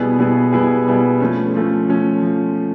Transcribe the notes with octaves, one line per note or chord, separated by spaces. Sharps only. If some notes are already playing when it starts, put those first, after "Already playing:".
Already playing: B2 G3 B3 E4 G#4
B2 G3 B3 E4 G#4
B2 G3 B3 E4 G#4
B2 G3 B3 E4 G#4
F3 A3 C#4
F3 A3 C#4
F3 A3 C#4
F3